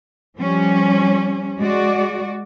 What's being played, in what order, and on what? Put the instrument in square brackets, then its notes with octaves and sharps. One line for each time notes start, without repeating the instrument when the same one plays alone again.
[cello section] F3 G3 C#4
G#3 F#4 D5